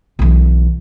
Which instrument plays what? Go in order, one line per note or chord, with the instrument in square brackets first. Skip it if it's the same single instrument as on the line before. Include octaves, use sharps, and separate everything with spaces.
[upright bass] B1 E3